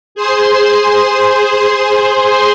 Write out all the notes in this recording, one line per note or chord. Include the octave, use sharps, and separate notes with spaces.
G#4 C5 C6